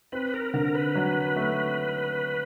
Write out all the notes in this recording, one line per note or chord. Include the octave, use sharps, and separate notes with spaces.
C4 B4
A#4
D3 A#4
B4
F#3
A3